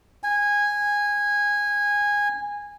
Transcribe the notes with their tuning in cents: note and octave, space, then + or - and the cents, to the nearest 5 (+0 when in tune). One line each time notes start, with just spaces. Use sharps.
G#5 -15